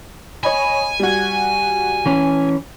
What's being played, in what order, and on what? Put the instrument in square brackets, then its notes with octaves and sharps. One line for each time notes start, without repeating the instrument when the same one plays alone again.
[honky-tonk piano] C#5 D#5 B5 [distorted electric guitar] G#5
[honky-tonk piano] G3 F#4
[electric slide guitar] E3 C#4